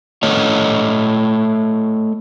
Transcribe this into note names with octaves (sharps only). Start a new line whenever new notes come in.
A3 C#5 D#5